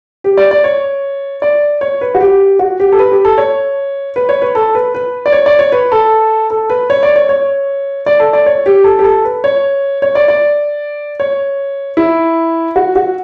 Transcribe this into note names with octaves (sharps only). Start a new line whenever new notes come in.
G4
D5
D5
C#5
D5
C#5
B4
F#4
G4
F#4
G4
A4
B4
G4
A4
C#5
B4
C#5
B4
A4
B4
B4
D5
C#5
D5
C#5
B4
A4
A4
B4
C#5
D5
C#5
C#5
D5
A4
D5
C#5
G4
A4
G4
A4
B4
C#5
C#5
D5
D5
C#5
E4
F#4
F#4